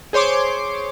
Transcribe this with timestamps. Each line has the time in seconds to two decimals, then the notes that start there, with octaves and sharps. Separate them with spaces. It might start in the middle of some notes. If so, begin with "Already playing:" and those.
0.13 G#4 C5 C#5 C6 D6